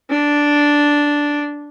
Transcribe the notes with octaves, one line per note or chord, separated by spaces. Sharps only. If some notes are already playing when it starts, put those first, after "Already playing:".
D4